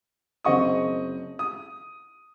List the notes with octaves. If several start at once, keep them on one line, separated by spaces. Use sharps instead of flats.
F#1 C4 D#5 C#6 D#6
D#6